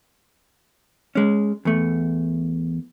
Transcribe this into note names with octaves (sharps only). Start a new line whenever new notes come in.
G#3 C#4
E2 A3